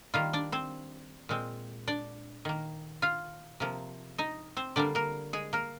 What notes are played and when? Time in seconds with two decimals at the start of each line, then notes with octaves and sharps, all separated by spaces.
0.14 D#3 G3 A#3 F4 F5
0.33 D4 D5
0.52 C4 C5
1.29 A#2 G#3 C4
1.88 D4 D5
2.45 D#3 A#3
3.02 F4 F5
3.60 C3 F3 A#3
4.18 D#4 D#5
4.57 C4 C5
4.76 D3 G3 A#3 D4 D5
4.95 A#3 A#4
5.33 G#3 G#4
5.53 A#3 A#4